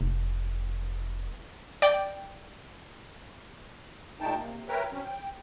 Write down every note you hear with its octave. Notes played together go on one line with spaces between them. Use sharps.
F1
D5 G5
A#2 G#3 A3 D#4 G5 A5
C3 A#3
A#4 B4 C#5 E5 G5 A#5
F#3 C4 C#4
G5